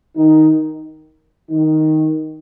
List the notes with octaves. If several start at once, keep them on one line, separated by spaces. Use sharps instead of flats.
D#3 D#4
D#3 D#4